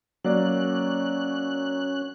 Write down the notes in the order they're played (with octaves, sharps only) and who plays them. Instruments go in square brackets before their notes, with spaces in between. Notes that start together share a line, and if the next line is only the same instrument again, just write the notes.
[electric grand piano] F#3 A#3 D5 [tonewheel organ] C#4 F#6